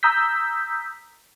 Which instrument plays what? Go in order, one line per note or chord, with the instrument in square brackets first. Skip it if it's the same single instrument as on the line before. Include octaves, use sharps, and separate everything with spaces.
[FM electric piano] A#5 D#6 E6 G6 B6